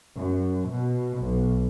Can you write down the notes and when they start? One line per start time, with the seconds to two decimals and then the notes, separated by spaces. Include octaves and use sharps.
0.15 F#2
0.68 B2
1.20 B1